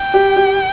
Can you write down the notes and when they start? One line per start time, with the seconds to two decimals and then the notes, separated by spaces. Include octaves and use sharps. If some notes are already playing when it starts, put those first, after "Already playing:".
Already playing: G5
0.14 G4
0.36 G4